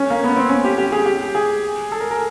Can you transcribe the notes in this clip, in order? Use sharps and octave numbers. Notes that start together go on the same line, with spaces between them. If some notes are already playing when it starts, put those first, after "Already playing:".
Already playing: C#4
A#3
B3
C4
C#4
G4
G4
G#4
G4
G#4
A4
A#4
A#4